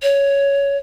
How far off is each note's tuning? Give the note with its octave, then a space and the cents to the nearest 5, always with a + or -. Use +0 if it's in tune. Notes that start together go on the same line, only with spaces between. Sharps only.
C#5 +10